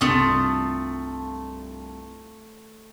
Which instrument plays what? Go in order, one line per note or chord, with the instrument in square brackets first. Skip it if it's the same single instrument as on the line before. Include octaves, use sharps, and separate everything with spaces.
[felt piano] C2 G2 [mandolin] A3 F4 D#6